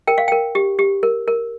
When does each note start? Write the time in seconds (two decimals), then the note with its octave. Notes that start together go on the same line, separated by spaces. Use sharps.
0.07 A#4 G5
0.18 F5
0.28 A#4 G5
0.55 G4
0.79 G4
1.03 A#4
1.28 A#4